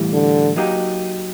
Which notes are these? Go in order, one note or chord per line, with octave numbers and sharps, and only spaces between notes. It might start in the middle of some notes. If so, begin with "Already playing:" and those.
Already playing: A2 E3 G3
D3
F#3 A#3 D#4 G4